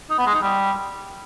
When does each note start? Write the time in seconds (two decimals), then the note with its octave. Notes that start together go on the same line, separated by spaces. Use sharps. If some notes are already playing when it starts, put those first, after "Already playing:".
0.10 D#4
0.18 B3
0.26 G#3
0.34 D#4
0.42 G3